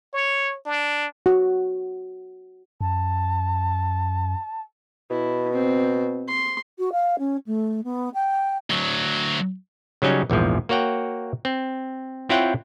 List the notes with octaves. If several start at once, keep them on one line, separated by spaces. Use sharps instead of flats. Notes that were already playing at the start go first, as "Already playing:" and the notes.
C#5
D4
F#4
F#2 A5
B2 E4
C4
C6
F#4
F5
C#4
A3
B3
G5
D2 F#3
C#3 F#3 G3 C#4 D#4
A#1 E2 G#2 F3
A#3 F#4 C#5 F#5 G5
C4
C4 E4 F4 C#5 F#5 G5